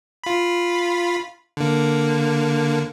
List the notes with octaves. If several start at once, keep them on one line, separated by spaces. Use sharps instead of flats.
F4 B5
D3 A#3